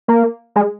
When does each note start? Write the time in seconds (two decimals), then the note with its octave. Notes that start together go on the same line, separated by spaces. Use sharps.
0.08 A#3
0.56 G#3